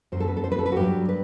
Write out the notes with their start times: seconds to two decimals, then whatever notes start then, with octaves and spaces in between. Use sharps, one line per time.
0.12 F#2 F#3 C5
0.20 A4
0.28 B4
0.37 A4
0.44 C5
0.52 B4
0.59 A4
0.66 B4
0.72 F#4
0.76 G2 F#3 G4
1.09 B4